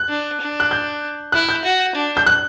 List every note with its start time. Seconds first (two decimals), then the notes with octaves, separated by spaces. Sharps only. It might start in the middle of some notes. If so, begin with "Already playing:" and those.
Already playing: F#6
0.09 D4
0.41 D4
0.60 F#6
0.71 G6
1.32 E4 F#6
1.49 G6
1.64 F#4
1.95 D4
2.17 G6
2.26 F#6